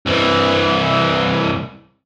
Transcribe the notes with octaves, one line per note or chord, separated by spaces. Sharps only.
C2 E3